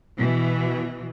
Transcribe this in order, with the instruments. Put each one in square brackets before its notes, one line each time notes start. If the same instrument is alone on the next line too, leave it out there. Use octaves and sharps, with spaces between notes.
[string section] B2 E3